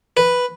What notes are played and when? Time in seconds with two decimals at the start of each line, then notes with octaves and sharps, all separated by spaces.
0.17 B4